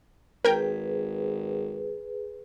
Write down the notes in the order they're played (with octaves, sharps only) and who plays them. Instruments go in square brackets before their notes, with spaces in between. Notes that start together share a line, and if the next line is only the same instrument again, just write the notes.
[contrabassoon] G#1 [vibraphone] G#4 B4 [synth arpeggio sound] A#4 G5